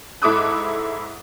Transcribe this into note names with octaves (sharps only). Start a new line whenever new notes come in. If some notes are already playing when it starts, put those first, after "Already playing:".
G#2 E4 A4 D6 D#6 F#6